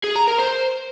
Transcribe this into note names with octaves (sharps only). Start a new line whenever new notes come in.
G#4
A#5
A#4
C5